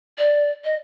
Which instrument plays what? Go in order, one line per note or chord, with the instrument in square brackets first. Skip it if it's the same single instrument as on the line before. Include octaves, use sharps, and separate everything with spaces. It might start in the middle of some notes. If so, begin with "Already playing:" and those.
[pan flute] D5
D#5